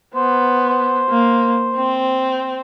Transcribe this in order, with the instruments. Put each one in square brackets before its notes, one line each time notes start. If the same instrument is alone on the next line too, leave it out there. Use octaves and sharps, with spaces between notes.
[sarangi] B3 [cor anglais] C5
[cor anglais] C5
[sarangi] A#3
C4